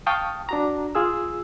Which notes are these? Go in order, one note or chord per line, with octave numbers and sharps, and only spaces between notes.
F5 G5 A5 C#6 D#6
D4 F#4 A#5
F4 G#4 E6